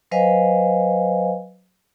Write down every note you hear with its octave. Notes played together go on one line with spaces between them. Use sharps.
F#3 B4 C5 D#5 F5 G#5